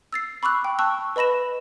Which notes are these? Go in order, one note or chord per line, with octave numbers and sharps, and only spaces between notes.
E6 A6 C7
B5 C#6 D6 E6 F#6
G5
A5 C#6 E6 F#6
B4 D#5 B5 A#6 E7